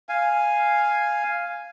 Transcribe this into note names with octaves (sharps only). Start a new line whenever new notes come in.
F5 G#5